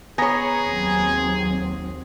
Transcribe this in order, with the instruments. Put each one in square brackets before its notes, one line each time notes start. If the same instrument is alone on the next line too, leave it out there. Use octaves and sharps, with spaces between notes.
[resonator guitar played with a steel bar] B3 C#5 [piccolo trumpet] G#4 [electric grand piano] G#5 A#5 A#6
[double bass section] D#2 F#3 C4